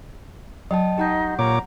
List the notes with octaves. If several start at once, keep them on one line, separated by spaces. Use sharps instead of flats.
F#3 D#5 G5 A5
D#4 G4 F#5 G6
A#2 C#5 A#5 D6